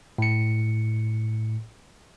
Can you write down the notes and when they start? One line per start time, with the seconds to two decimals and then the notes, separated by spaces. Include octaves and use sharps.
0.18 A2 C#7